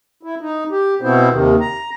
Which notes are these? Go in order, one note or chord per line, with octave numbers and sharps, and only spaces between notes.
E4
D#4
G4
B2 B3 C4 E4 C5
D#2 C3 D#3
A#5